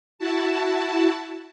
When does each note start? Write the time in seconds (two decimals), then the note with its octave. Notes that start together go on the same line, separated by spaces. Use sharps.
0.19 E4 F#4 A5